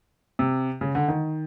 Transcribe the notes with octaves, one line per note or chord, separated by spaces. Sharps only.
C3
C#3
D3
D#3